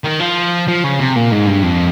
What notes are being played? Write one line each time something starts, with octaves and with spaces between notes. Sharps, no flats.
D#3
F3
F3
C#3
C3
A#2
G#2
G2
F2